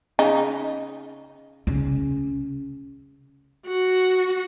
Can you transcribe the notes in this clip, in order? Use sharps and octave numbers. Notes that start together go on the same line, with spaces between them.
C#3 D#4
C#3 C#4
F#4